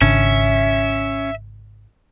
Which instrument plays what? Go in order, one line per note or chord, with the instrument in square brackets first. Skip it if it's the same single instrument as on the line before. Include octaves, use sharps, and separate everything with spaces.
[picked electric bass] G#1 C#3 D4 [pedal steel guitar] C#4 [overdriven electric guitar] E5